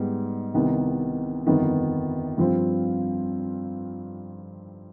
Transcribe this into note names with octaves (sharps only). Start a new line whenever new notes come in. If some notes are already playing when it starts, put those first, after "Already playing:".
Already playing: G#2 G3 B3
C2 C3 D#3 B3
G1 F2 D#3 B3
G2 F3 C4 F4